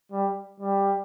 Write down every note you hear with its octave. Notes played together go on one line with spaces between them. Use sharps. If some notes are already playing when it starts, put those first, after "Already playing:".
G3
G3